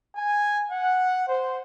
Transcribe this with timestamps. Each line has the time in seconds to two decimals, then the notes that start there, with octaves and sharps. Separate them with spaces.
0.16 G#5
0.72 F#5
1.28 C5